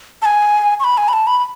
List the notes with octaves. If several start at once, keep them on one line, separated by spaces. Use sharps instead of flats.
A5
G#5
C#6
B5
G#5
B5
A5
B5
B5